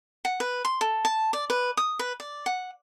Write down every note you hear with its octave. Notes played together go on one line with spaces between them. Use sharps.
F#5
B4
C6
A4
A5
D5
B4
D#6
B4
D5
F#5